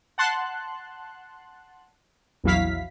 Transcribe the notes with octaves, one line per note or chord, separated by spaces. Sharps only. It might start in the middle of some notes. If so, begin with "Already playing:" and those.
F#5 A5 C6 F#6
A#1 E2 F#3 E4 F5 B6